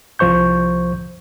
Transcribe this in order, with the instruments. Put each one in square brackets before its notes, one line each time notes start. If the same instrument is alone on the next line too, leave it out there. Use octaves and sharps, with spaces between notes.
[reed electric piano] C2 F3 C5 C#6 G6